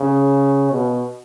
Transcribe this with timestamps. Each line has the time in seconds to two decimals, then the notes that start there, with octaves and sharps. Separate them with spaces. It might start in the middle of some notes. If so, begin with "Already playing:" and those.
Already playing: C#3
0.70 B2